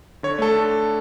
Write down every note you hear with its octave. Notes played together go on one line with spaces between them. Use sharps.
D3 C#5
A3 A4
D3